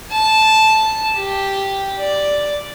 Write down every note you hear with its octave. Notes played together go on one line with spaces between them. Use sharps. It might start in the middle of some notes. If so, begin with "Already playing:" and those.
A5
G4
D5